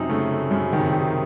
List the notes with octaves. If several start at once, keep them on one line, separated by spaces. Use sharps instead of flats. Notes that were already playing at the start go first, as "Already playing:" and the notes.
Already playing: F#2 C3 D#4
C#3 A3
A3
F#2 C#3
D#3
C3
D#4
D#3